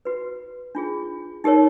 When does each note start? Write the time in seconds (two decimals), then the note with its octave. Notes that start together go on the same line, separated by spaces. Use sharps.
0.05 F#4 B4
0.75 D4 F4 G#4
1.44 D#4 G4 A#4 C#5